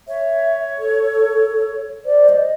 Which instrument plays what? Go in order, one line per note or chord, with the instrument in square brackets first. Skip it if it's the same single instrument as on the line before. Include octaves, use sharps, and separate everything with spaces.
[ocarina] C#5 [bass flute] E5
[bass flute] A4
[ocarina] C5 [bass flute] D5
[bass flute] D#5